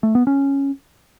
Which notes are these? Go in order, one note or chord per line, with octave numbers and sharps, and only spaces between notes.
A3
B3
C#4